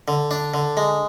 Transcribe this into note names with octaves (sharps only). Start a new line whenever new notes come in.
D3
D4
D3
G#3